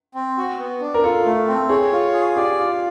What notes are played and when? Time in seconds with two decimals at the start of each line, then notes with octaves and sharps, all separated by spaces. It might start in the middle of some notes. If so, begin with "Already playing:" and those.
0.15 C4
0.38 F#4
0.59 B3
0.81 D4
0.94 A#4
1.03 F4 A4
1.25 A3
1.48 C4
1.69 G#4 C#5
1.92 F4
2.13 G#4
2.36 G4 D5
2.58 F4